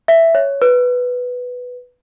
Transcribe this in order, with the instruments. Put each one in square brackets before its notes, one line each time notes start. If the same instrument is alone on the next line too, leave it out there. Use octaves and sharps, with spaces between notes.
[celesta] E5
C#5
B4